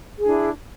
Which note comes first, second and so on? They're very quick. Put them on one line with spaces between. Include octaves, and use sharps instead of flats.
G#4 D4 E4